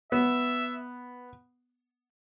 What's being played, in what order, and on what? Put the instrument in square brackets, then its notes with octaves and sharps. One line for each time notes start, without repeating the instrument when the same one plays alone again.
[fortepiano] B3 [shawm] E5